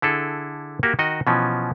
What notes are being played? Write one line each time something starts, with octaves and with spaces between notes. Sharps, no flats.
D3 E4 G#4 A4
A#3 F#4 G4
D#3 F#4 D#5
B2 E3 F3 C#4